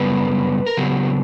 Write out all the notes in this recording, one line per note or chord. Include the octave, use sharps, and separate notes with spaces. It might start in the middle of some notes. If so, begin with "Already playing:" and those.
Already playing: F#2 C#3 G3 B3 B4
A#4
C#3 F#3 B3 G4